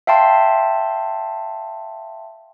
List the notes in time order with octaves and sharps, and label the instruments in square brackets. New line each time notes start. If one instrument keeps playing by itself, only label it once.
[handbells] E5 F5 G5 A5 C6